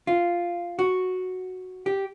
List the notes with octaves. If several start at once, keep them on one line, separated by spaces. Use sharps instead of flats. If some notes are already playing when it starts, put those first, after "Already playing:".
F4
F#4
G4